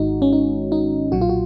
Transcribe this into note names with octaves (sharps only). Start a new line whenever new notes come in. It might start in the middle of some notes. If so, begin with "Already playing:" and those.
Already playing: G#1 G#2 D#3 G#3 D#4 F#4
C#4
D#4
D#4
B1 A#2 F#3 F#4
F4
F#4